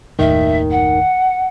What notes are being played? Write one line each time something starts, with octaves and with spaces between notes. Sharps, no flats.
F#1 D#2 A2 D#3 E5
F#5